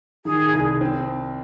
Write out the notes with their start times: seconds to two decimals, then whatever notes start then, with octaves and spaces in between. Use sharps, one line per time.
0.25 D#3 G#4
0.53 C2
0.81 C4